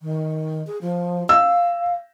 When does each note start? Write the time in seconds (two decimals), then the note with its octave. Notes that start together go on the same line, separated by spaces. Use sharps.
0.01 D#3
0.67 G#4
0.81 F3
1.29 F5 E6